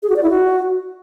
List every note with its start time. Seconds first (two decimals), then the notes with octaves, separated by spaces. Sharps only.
0.03 G#4
0.10 F#4
0.16 D5
0.23 E4
0.30 F#4